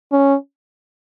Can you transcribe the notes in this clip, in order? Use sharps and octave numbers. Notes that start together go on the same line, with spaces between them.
C#4